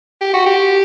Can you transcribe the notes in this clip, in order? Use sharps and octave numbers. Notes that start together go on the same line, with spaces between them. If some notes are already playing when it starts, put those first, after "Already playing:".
G4
F#4
G4